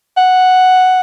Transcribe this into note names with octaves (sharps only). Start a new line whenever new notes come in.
F#5